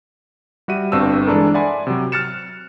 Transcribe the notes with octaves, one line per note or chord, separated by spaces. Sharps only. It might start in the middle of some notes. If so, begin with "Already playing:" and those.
G3 F#4 E5 D#7
G1 G2 C4 A5 E6
E3 G#3 D4 E4 A4 A#4
D5 E5 F#5 G#5 B5 C6
C3 F#3
F6 F#6 A6 C#7 E7